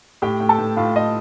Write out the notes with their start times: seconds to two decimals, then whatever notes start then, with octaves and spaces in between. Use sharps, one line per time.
0.22 A2 G4 G5
0.40 A2
0.49 A4 A5
0.58 A2
0.76 A2 F4 F5
0.95 A2 D#5